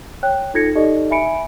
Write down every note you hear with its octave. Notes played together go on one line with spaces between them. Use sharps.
C#5 G5 F#6
D#4 F4 A4 G#6 A#6 C#7
D#4 G4 A4 D5 D#5
E5 G#5 B5 C#7 D7